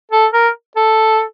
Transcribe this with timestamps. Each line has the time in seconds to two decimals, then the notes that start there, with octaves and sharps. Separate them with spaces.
0.11 A4
0.33 A#4
0.76 A4